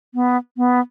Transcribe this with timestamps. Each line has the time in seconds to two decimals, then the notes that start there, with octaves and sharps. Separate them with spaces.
0.14 B3
0.57 B3